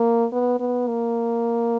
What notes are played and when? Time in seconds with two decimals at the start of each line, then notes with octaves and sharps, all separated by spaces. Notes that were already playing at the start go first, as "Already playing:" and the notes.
Already playing: A#3
0.32 B3
0.60 B3
0.87 A#3